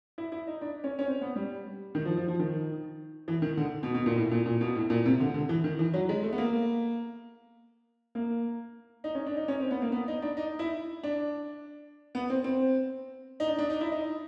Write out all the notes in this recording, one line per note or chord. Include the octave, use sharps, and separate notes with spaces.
E4
E4
D#4
D4
C#4
C#4
C4
B3
G3
D#3
F3
F3
F3
D#3
E3
D#3
D3
B2
B2
A#2
A2
A#2
A#2
B2
A2
A#2
C3
D3
D3
E3
D#3
E3
F#3
G#3
A3
B3
A#3
A#3
D#4
C#4
D4
D#4
C#4
C4
B3
A#3
B3
D#4
D4
D#4
E4
D4
B3
C4
C4
D#4
D4
D4
D#4
E4
D#4